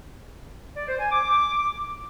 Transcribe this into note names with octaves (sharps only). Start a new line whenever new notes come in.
D5
C5
G#5
D6